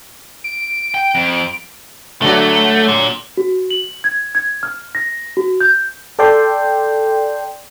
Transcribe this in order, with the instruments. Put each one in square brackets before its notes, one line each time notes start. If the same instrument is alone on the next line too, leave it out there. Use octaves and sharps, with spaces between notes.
[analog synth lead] D7
[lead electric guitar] G5
F2
[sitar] D3 F#3 D5 [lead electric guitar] A3
[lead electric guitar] A#2
[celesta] F#4
F#7
G#6
G#6
F6
A#6
F#4
G6
[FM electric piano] A4 D5 G5 C6